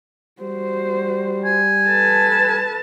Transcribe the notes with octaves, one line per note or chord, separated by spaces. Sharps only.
G3 F#4 C5
G#5
A4 B4 A5